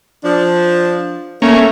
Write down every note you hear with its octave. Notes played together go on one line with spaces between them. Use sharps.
F3 D4
A3 A#3 C#4